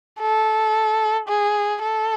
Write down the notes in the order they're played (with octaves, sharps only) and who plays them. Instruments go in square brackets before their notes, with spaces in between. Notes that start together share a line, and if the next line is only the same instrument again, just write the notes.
[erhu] A4
G#4
A4